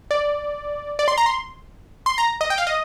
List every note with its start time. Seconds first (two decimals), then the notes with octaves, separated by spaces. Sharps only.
0.11 D5
0.99 D5
1.08 C6
1.18 A#5
1.26 C6
2.06 C6
2.18 A#5
2.41 D#5
2.50 G5
2.58 F5
2.67 D#5